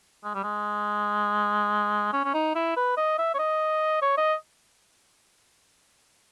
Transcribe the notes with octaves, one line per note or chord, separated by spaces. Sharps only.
G#3
G3
G#3
C#4
C#4
D#4
E4
B4
D#5
E5
C#5
D#5
C#5
D#5